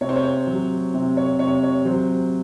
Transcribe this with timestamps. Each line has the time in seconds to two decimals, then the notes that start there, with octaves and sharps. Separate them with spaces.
0.01 C3 C#5
0.09 C5
0.16 C#5
0.47 F#3
0.94 C3
1.17 C#5
1.39 C3 C#5
1.63 C#5
1.85 F#3 C5